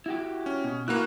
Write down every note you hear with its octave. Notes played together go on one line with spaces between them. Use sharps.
E4 F#4 G4
C#4
B2
A#3 E4 F#4 B4 F5 F#6